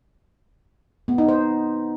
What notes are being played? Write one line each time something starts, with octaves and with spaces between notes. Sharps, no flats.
B3
D#4
C5